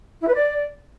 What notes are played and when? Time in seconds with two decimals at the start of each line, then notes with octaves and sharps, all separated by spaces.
0.22 E4
0.28 B4
0.34 D5